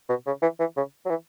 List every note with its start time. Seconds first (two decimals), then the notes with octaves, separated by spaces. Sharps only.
0.09 B2
0.27 C#3
0.42 E3
0.60 E3
0.77 C#3
1.06 F#3
1.10 E3